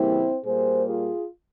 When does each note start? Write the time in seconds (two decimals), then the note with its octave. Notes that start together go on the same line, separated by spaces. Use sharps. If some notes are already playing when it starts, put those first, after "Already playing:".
Already playing: C#3 E3 G3 A#3 C4 E4
0.44 A#2 G3 A#3 G#4 C5
0.85 F4 G#4